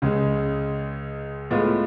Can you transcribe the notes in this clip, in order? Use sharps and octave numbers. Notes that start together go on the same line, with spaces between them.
C#2 C#3 G#3
A2 G#3 B3 F4